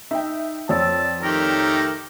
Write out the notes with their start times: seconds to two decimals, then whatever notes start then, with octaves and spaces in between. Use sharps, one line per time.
0.11 D#4 E5 G5
0.69 F2 C#5 D5 A5 E6
1.22 D#3 A3 G4 A#4